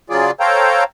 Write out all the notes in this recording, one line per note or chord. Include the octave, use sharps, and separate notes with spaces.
C#3 F#3 F4 G#4 D5
A4 C5 C#5 F5 G5 A#5